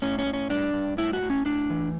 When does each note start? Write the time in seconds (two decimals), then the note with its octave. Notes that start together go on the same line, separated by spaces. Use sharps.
0.02 A2 C#4
0.19 C#4
0.26 A2
0.34 C#4
0.49 G2 D4
0.73 G2
0.97 A2 E4
1.13 F#4
1.22 A2
1.30 C#4
1.45 A2 D4
1.70 E3